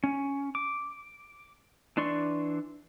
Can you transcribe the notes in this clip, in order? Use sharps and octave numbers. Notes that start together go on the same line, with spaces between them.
C#4
D6
E3 D4 D5 C6 C#6